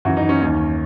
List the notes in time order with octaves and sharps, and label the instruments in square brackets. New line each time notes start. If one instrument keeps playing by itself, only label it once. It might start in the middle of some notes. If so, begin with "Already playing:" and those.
[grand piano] F#2 E3 F#4
D#4
C#4
D#2 D#3